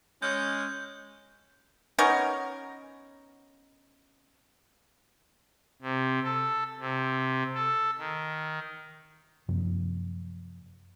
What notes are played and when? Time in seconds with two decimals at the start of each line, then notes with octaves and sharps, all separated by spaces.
0.22 G#3 C#4 G6
1.99 B3 C#4 D#4 A#4
5.82 C3
6.23 A4
6.80 C3
7.54 A4
7.98 D#3
9.48 F#2 C3 F3 A#3